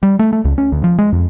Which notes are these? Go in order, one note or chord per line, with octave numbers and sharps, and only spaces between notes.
G3
A3
A3
C#2
C#4
D2
F3
G#3
F2